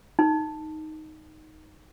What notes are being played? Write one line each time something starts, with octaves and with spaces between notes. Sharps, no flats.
D#4